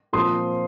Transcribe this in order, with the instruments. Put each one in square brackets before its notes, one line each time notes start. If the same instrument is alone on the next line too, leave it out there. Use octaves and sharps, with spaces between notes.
[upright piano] A#2 F3 C4 C6 D#6